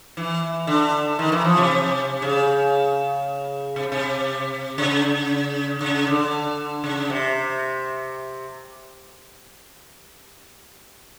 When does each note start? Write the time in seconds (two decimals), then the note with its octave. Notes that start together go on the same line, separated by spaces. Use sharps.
0.17 E3
0.67 D3
1.19 D#3
1.32 E3
1.44 F3
1.57 C3
2.22 C#3
3.76 C3
3.92 C3
4.78 C#3
5.81 C#3
6.07 D3
6.84 C#3
7.10 C3